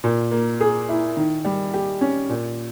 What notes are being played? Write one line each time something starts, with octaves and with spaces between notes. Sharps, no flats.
A#2
A#3
G#4
E4
D#3
G3
G4
C#4
A#2